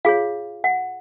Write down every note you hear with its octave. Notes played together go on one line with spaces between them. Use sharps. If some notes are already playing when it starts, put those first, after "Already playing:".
F4 G#4 C#5 F5
F#5